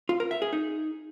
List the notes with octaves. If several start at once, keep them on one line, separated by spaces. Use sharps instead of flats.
F4
A#4
E5
G#4
D#4